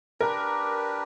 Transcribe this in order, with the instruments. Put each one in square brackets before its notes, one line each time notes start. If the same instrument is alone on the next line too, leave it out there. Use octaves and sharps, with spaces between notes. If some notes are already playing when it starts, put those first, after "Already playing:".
[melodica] D4 G4 B4 [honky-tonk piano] A#4